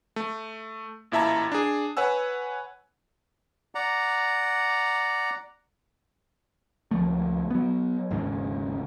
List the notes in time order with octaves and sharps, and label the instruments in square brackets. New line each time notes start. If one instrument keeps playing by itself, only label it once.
[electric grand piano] A3
A1 A#2 E4 E5 A5 A#5
D4 G#4
B4 C#5 F#5 G#5 E6
[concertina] D5 F#5 A#5
[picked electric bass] C#2 F3 A3
F#3 B3
G#1 D#2 G#2 C#3